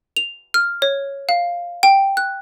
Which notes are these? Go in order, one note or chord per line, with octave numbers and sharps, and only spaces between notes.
F7
F6
C#5
F5
G5
F#6